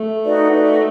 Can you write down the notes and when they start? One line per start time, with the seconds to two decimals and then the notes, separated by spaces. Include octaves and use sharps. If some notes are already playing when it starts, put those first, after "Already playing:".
Already playing: A3
0.22 D#4 F#4 B4 D5
0.51 D#4 F#4 B4 D5